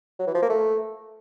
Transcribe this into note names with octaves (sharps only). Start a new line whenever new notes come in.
F#3
E3
F3
A#3
A3